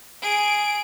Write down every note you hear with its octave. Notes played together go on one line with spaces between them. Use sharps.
G#4 D7